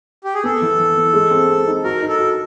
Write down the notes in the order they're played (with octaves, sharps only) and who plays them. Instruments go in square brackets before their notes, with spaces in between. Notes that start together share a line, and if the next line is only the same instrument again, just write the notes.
[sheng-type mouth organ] G4
G#4
[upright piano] B3 [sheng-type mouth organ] A4
[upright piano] E3
E3
B3
G#3
C4
C4
D#4
[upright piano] F#4 [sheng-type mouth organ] A#4
[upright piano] D#4
[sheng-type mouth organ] A4
[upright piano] F#4